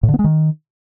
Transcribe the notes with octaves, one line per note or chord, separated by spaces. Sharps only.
A2
D3
B3
G#3
D#3